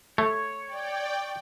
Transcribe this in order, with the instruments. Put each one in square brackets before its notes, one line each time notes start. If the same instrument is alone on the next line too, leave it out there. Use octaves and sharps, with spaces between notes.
[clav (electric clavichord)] A3 [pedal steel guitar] C#5
[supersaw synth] D5 G5